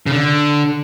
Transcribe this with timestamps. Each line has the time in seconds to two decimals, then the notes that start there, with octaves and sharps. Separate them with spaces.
0.06 C#3
0.12 D3